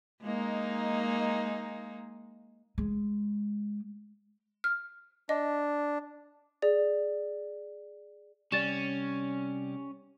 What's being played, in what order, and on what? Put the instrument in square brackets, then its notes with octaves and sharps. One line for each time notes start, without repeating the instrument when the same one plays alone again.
[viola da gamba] G#3 A#3 D#4
[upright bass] G#3
[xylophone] F6
[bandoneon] D4 [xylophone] D#5
[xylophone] G#4 D5
[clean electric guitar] C2 G3 [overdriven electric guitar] C#4 [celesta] D5 A6 E7